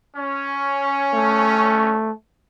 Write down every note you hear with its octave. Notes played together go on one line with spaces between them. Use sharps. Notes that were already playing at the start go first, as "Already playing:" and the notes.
C#4
A3